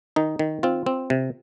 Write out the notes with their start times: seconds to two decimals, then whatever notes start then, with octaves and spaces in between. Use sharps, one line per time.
0.16 D#3 D#4
0.39 D#3
0.63 C4 F4
0.86 C4
1.10 C3